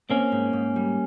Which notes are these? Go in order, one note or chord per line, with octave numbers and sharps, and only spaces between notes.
A#3 C4 C#4
G#2
G#2
G3